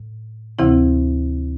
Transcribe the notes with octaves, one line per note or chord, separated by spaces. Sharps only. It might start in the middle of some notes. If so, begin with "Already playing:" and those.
Already playing: A2
D2 C3 E3 C4 E4